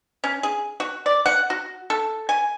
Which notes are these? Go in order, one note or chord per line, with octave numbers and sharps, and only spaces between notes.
C#4
G#4
F#4
D5
F#5
F#4
A4
G#5